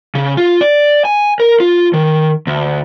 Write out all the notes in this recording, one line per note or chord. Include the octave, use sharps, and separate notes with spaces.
C#3
F4
D5
G#5
A#4
F4
D#3
D2